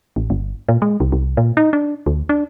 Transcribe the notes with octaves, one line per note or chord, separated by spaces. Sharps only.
A1
G1
A#2
G#3
C2
C2
A#2
D#4
D4
D2
D4